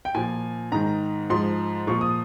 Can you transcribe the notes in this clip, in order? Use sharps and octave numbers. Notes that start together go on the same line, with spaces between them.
G5
A#2 F3 G#5
G#2 D#3 A#5
G#2 F3 C6
A#2 F3 C#6
D#6